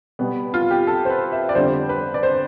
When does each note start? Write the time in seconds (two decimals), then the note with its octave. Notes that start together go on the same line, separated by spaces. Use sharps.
0.19 B2 G3 B3
0.54 F4
0.71 G4
0.87 A4
1.05 C5
1.10 B4
1.32 E5
1.49 D5
1.55 F2 D3 G3 B3 C5
1.89 B4
2.14 D5
2.23 C5